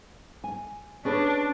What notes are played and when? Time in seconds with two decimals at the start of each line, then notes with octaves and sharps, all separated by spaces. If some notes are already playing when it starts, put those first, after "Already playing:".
0.44 G#5
1.05 C#4 D4 G#4 B4